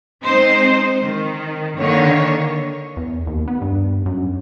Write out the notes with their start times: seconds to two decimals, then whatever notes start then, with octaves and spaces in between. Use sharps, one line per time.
0.23 G#3 C4 D#4 C5
1.02 D#3
1.76 D3 D#3 A#3 C#5
2.97 E2
3.27 D#2
3.48 B3
3.62 G2
4.06 F#2